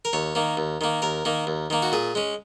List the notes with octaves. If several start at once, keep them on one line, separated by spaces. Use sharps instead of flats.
A#4
D#2 C#5
D#3 A#3
D#2
D#3 A#3
D#2 A#4
D#3 A#3
D#2
D#3 A#3
F#4
A#2 G#4
G#3 C#4